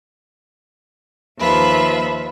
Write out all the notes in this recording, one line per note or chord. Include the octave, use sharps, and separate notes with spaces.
D#2 F3 B4 E5